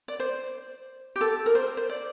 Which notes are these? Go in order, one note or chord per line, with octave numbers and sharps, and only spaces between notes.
D5
C5
G4
A4
A#4
C5
C5
D5